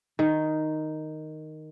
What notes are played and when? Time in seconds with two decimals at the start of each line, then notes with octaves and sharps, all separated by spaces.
0.19 D#3